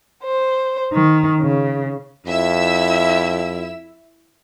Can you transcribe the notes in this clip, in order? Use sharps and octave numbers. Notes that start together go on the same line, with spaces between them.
C5
D#3
C#3
F2 E4 E5 E6